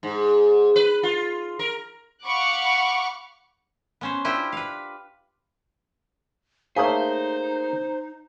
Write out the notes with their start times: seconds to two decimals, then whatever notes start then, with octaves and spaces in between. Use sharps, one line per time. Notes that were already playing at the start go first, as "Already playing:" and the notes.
0.03 G#2
0.76 B4
1.03 F4
1.59 A#4
2.24 F5 F#5 B5 C#6 D6 F#6
4.01 B3 C#4 C5
4.25 D4 E4 F4 G4 C5
4.52 B4 F5
6.76 A3 A#3 D#4 G#4 C5 C#5 F5